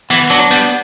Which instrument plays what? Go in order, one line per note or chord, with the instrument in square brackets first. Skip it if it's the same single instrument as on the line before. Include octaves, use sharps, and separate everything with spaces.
[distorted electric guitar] E3 [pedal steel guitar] B3
[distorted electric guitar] F#3 [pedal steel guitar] D4
[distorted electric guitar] G3 [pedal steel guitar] B3